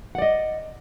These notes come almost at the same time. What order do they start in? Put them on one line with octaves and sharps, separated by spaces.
F#5 D5 D#5